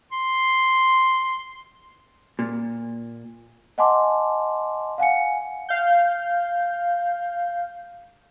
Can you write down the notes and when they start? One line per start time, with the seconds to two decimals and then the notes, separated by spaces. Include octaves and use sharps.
0.12 C6
2.39 A#2
3.78 D#5 F#5 G#5 A5 C6 D6
4.98 F5 F#5 G#5 C#7
5.69 F5 G6